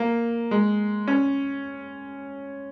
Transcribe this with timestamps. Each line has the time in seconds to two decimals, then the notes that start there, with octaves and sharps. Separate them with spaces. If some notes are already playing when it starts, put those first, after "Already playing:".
Already playing: A#3
0.51 G#3
1.08 C#4